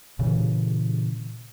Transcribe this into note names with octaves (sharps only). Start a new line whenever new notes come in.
A#2 C#3 E3